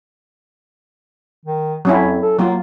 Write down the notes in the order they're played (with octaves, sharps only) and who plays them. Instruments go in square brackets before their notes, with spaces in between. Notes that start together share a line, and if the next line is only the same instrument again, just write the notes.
[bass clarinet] D#3
[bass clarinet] F2 [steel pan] F#3 C#4 E4
[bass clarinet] A4
[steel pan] F#3 F4 [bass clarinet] A#3